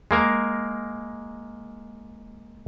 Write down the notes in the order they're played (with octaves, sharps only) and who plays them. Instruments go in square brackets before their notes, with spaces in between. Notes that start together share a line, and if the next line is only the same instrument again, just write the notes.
[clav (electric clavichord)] G#3 A#3 A#4